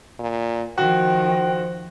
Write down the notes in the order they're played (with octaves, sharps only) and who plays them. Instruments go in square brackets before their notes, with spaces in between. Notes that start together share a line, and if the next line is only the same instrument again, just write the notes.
[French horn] A#2
[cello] D#3 F3 [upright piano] F#4 [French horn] C5 [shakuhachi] G5